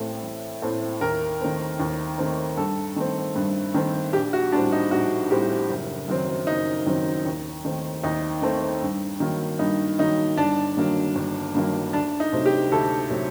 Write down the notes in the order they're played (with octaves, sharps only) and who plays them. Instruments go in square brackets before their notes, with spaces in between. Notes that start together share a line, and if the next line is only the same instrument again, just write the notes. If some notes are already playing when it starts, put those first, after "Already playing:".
Already playing: [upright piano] A1 A2 A3 C4
A1
A2 A3 C4
D#2 A#4
D#3 A3 C4
D#2
D#3 A3 C4
G2 A4
D#3 A3 C4
G2
D#3 A3 C4
A#1 G4
F#4
A2 G3 C4 D4
D#4
A#1 F#4
A2 G3 C4 G4
F#1
F#2 D#3 F#3 C4
F#1 D#4
F#2 D#3 F#3 C4
D#2
D#3 A3 C4
D#2 D#4
D#3 A3 C4
G2
D#3 F#3 A#3
G2 D#4
D#3 F#3 A#3 D#4
G1 D4
G2 D#3 F#3 A#3
G1
G2 D#3 F#3 A#3
D2 D4
D#4
C3 F#3 A3 C4
G4
D2 A4
C3 F#3 A3 C4